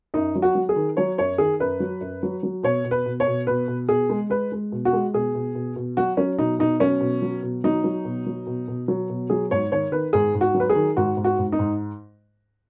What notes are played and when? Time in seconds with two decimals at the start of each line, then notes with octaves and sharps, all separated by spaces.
0.14 F#2 D#4
0.35 F#3
0.42 F#4
0.55 F#3
0.69 G#4
0.76 D#3
0.97 F#3 C#5
1.18 F#2 C#5
1.38 D#3 G#4
1.60 F#2 B4
1.80 F#3
2.01 F#2
2.23 F#3
2.43 F#3
2.63 B2 C#5
2.85 B2
2.91 B4
3.06 B2
3.20 C#5
3.27 B2
3.47 B2 B4
3.68 B2
3.89 B2 G#4
4.10 G#3
4.30 G#3 B4
4.52 G#3
4.72 B2
4.85 F#4
4.93 G#3
5.13 B2 G#4
5.35 B2
5.55 B2
5.76 B2
5.97 F#3 F#4
6.17 F#3 C#4
6.38 B2 D#4
6.59 B2 D#4
6.80 F#3 C#4
7.01 B2
7.22 F#3
7.43 B2
7.64 F#3 D#4
7.84 F#3
8.05 B2
8.26 F#3
8.47 B2
8.68 B2
8.88 F#3
9.09 B2
9.30 F#3 G#4
9.51 G#2 C#5
9.72 D#3 C#5
9.92 D#3 B4
10.13 G#2 G#4
10.34 G#2
10.41 F#4
10.54 F#3
10.60 B4
10.69 G#4
10.75 D#3
10.97 G#2 F#4
11.17 G#2
11.24 F#4
11.39 G#2
11.52 D#4
11.59 G#2